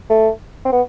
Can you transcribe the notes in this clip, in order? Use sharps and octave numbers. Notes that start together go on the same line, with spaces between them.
A3
C4
B3